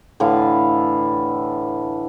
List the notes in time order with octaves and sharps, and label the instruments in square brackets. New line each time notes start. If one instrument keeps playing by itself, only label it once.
[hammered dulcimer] A2 D3 E3 F5